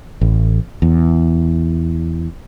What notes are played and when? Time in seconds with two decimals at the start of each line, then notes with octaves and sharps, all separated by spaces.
0.21 A1
0.82 E2